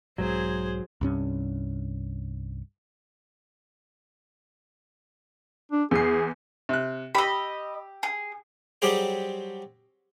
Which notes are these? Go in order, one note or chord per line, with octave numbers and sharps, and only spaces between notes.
B1 G#2 F#3 G#4 C5
C2 G2 C#4
D4
E2 G#4 C7
C3 F#6
G4 D#5 B5 E6
G#4
F#3 G3 C4 G4 G#4 C5